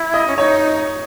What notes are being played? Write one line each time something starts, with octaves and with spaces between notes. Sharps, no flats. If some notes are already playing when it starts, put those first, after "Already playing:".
Already playing: E4
D#5 D#6
C#4
D#4 C#5 C#6